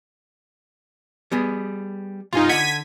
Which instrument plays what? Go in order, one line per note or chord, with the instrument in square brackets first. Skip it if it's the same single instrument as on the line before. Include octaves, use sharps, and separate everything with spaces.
[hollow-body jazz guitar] G3 B3 G#4
[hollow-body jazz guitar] C2 G2 G#5 [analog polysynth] D#4 F4
[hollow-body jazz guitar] D3 F#5 [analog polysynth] G#6 B6 D#7